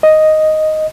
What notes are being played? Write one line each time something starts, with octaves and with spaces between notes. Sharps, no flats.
D#5